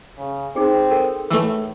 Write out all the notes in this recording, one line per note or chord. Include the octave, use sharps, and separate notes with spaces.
C#3
C4 D#4 G#4
A4 A#4 G5
A2 E3 A3 E6